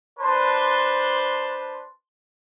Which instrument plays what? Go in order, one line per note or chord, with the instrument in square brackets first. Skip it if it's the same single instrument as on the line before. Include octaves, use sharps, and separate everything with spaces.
[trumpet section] D4 B4 C5 A5 C6